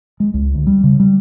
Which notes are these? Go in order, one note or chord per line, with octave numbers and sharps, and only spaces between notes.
G#3
C#2
D2
G3
C#3
G3